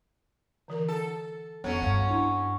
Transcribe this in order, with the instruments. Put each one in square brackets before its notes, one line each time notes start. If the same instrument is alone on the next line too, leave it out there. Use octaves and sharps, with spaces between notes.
[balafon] D3 E3 A#4
[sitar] A4
[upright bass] F2 [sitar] F#3 C#4 [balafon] B3 C#5
[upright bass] G2 [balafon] C#5 F5
[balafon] D4 E4